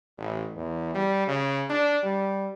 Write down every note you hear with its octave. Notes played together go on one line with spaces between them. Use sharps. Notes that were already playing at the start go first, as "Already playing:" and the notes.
A1
E2
G3
C#3
D4
G3